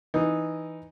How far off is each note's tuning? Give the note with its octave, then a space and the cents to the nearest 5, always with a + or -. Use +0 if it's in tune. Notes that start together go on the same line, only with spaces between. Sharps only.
E3 +0 D#4 +0